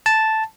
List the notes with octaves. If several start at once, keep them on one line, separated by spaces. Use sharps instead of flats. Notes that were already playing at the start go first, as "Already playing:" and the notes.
A5